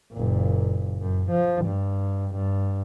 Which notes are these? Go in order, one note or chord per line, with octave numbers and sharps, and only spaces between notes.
F#1 A#2
F#2
F3
G2
G2